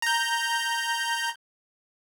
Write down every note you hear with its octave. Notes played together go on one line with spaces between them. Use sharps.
A#5 G6